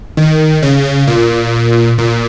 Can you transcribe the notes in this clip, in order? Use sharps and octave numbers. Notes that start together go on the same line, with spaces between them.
D#3
C#3
A#2
A#2